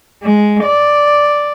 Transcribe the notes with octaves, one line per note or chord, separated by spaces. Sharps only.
G#3
D5